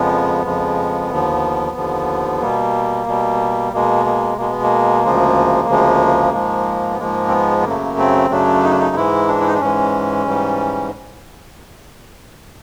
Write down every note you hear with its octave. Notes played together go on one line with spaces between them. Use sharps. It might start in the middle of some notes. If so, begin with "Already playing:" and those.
Already playing: F2 C#3 F3 G#3 B3
F2 C#3 F3 G#3
D#2 D3 F3
D#2 D3 F3
B2 G3 A#3
B2 G3
B2 G#3 A#3
A#3
B2 G#3 A#3
B3
A#3
D2 C#3 F3 G#3
D2 C#3 F3 G#3
G#2 F3 G#3
B3
G#2 F3 G#3 A#3
C4
B3
B3
F#2 C#3 F#3 A3 A#3
C4
F#2 C#3 F#3 A3 D4
D#4
D4
D#4
G#2 E3 G#3 E4
D4
E4
D#4
D4
G#2 E3 G#3 C#4
G#2 E3 G3